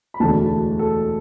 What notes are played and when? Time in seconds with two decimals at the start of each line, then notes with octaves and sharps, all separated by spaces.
0.14 B5
0.20 E1 D2 D3 A5
0.79 A4